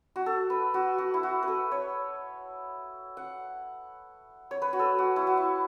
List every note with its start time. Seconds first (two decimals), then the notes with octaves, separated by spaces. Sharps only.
0.16 F#4
0.26 A4
0.50 B4
0.74 F#4
0.98 F#4
1.14 E4
1.23 F#4
1.43 B4
1.48 A4
1.72 C#5
3.17 F#5
4.51 C#5
4.62 B4
4.73 F#4
4.79 A4
4.98 F#4
5.16 E4
5.27 F#4
5.37 E4